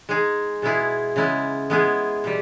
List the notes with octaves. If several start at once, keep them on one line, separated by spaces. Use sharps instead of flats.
G#3 D#4 G#4
B2 G#3 B3 E4 G#4
C#3 G#3 B3 E4
G#3 B3 E4 G#4
B2 G3